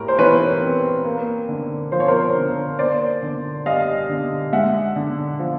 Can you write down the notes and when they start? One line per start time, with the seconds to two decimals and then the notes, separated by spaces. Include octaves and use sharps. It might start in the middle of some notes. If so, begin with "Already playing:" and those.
Already playing: A2 G3 A#4
0.08 C5
0.18 E3 B4 C#5
0.61 C4
1.05 A#3
1.49 D3
1.92 F3 C5
2.00 C#5
2.08 A#4 C5
2.36 D3
2.79 A#3 C5 D5
3.22 D3
3.66 G3 D#5 F5
4.09 D3
4.53 G#3 E5 F#5
4.96 D3
5.40 F3